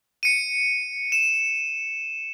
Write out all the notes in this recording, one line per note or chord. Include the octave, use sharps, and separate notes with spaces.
C#7 D#7
E7